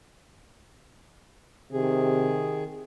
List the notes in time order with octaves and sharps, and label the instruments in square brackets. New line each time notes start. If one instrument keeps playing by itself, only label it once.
[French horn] C3 [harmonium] D#3 G#4